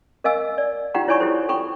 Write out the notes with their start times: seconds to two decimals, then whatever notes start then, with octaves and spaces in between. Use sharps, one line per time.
0.24 A#4 D#5 F5 G#5 E6
0.58 D5
0.94 D#4 F4 G4 F#5 G5 A#5
1.08 E4 C#5 D5 G#5 B5 C#6
1.20 E4 F#4 G4 A4 C5
1.49 A4 G5 B5 C#6